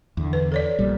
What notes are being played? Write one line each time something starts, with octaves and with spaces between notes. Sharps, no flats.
E2 D3
B4
A4 C#5 D5
B1 A#2 G3